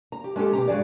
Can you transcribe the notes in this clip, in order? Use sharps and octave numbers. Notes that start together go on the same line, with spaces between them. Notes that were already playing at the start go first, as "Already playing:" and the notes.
A#5
G4
G#3 C#4 F4 G4 A4
B2 G4 A#5
G2 F#3 G#3 G#4 D5